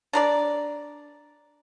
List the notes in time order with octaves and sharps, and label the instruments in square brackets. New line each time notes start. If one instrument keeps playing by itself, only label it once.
[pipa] D4 A#4 D5